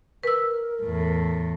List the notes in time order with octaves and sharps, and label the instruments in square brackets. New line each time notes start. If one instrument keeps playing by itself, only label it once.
[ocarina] A#4 [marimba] B4 E6
[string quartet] E2 A2